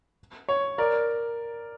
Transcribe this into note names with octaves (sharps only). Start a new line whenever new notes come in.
C#5
A#4 D5